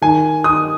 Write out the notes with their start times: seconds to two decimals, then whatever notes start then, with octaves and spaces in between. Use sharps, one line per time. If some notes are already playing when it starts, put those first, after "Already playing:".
0.02 D#3 G#5
0.44 D#3 D#6